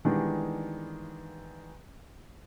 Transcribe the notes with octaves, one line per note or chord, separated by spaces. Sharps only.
D#3 E3 G3 G#3 B3 D4